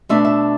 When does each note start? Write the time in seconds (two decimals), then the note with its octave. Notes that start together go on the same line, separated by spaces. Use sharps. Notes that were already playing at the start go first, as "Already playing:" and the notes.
0.09 B2 A3 D4 E5
0.25 E5